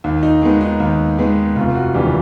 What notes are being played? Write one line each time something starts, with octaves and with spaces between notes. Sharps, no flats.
D#2
D#4
D#3 G#3 B3
D#4
D#2
D#3 G#3 B3
F1 F4
F#4
D#2 C#3 E3 G3 G4